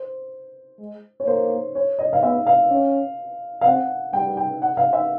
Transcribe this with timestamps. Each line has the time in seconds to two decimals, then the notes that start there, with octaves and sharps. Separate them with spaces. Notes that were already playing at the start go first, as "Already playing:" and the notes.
Already playing: C5
0.79 G#3
1.20 C#5
1.26 A#3 C5
1.75 C#5
1.99 D#5
2.13 F5
2.23 B3 E5
2.47 F5
2.70 C#4
3.61 F5
3.66 C4 F#5
4.13 G3 G5
4.37 G5
4.62 F#5
4.77 F5
4.93 E5